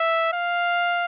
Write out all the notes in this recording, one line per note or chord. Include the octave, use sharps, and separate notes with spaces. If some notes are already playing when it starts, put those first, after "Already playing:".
Already playing: E5
F5